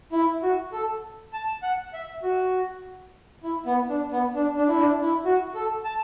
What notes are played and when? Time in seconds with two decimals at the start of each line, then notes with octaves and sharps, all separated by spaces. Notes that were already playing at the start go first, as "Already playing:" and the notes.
0.12 E4
0.43 F#4
0.73 A4
1.33 A5
1.63 F#5
1.94 E5
2.23 F#4
3.44 E4
3.66 B3
3.89 D4
4.12 B3
4.35 D4
4.57 D4
4.68 E4
4.79 D4
5.02 E4
5.25 F#4
5.55 A4
5.85 A5